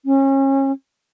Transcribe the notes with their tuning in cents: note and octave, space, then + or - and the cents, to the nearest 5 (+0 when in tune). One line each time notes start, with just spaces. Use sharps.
C#4 -30